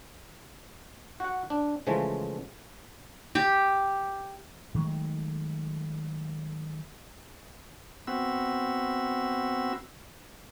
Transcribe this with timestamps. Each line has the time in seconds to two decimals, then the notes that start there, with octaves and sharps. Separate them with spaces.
1.20 F#4 F#5
1.50 D4
1.87 C#3 E3 F3 G#3 A3
3.35 G4
4.75 D#3 F#3 G#3 A3
8.07 B3 C4 F#4 E6